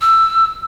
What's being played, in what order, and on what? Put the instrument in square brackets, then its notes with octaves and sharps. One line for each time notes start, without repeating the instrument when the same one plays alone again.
[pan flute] E6